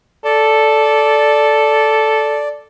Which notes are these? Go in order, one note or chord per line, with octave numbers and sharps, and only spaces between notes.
A4 D5